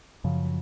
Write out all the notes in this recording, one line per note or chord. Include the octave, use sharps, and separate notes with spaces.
F#2 C#3 F3